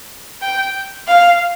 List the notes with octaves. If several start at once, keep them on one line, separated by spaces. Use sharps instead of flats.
G5
F5